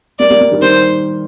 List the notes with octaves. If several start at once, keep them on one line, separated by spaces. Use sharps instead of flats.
G3 A#3 D5
G3 A#3
G3 A#3
D#3 G3
D#3 G3 C5